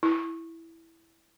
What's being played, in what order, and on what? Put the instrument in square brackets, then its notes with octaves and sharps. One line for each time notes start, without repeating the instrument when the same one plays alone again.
[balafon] E4